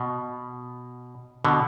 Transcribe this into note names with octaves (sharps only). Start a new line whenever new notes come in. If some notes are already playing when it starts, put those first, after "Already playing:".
Already playing: B2
B2 D3